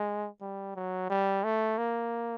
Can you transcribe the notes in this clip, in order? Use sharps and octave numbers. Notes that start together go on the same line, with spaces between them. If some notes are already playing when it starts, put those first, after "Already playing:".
Already playing: G#3
G3
F#3
G3
A3
A#3